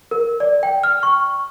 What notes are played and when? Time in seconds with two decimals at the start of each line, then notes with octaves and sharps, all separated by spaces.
0.11 A#4
0.40 D5
0.63 G5
0.84 F6
1.03 C#6